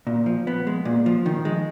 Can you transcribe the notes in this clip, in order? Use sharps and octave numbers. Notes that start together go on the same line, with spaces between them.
A#2
F3
B3
G#3
A#2
F3
D#3
G#3